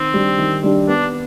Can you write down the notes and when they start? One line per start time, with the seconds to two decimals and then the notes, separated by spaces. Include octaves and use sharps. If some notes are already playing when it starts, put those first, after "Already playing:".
Already playing: D#3 C4
0.14 G3 D4 G4
0.38 D#3
0.63 G3 D4 G4
0.88 B3 D4